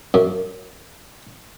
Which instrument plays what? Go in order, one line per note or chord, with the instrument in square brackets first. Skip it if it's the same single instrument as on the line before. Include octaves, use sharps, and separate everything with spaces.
[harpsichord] F#2